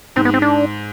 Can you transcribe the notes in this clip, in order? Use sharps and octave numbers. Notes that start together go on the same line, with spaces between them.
G#2 C4
B3
C4
D4